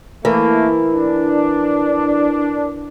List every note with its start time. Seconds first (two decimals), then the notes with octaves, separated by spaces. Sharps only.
0.25 E3 A3 A#3 A#4
0.94 D4